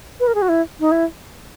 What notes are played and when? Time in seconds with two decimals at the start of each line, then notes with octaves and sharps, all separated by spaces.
0.20 B4
0.27 A#4
0.35 G#4
0.42 F#4
0.49 E4
0.80 D#4
0.92 E4